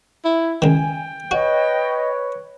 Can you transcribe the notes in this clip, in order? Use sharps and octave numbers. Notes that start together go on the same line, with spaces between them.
E4
C#2 D#3 G5 G#5
F#4 B4 C#5 D#5